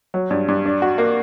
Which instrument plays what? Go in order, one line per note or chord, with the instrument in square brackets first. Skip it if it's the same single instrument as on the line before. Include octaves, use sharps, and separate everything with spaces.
[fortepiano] F#3
G2
G2
D4
F#4
A#3